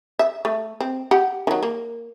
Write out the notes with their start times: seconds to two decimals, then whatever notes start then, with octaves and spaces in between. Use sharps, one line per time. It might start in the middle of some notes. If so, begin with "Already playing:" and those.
0.19 E5
0.45 A3
0.81 C4
1.11 G4 F#5
1.47 D#3 F#3
1.63 A#3